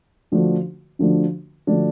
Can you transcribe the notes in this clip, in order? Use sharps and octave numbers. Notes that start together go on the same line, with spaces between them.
D3 F3 A3 D4 F#4
D3 F3 A3 D4 F#4
D3 F3 A3 D4 F#4